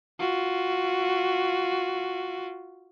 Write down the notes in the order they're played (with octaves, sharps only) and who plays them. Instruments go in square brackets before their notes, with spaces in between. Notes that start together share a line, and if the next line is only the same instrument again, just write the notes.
[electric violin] F4 F#4